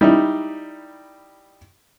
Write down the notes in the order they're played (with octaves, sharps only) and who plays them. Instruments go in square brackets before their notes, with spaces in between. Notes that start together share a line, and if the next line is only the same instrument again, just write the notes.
[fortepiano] G3 D#4 E4